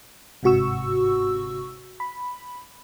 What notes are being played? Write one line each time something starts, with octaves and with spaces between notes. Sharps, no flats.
G1 G#2 C3 F#4 C#6 E6
B5